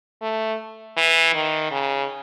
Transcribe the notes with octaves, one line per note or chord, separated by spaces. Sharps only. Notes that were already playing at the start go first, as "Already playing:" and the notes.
A3
E3
D#3
C#3